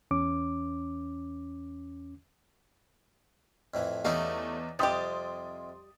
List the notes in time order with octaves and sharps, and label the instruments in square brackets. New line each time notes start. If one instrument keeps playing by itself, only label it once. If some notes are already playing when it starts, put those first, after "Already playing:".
[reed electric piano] E2 C#4 D6
[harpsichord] F2 A2 E3
[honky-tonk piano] E2 [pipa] G3 A3 F5 [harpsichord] C#4 D#4 E4
[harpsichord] F2 C3 [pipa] G3 G4 [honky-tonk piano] C6 D#6 A6